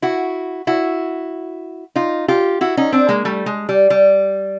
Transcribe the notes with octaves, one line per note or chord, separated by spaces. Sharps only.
E4 F#4
E4 F#4
D#4 F4
F4 G4
E4 F#4
C#4 D#4
C4 D4
G#3 A#3
G3 A3
G#3
G3
G3